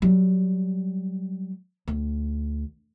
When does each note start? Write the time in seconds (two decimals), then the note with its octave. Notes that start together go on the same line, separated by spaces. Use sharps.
0.02 F#3 G3
1.88 D2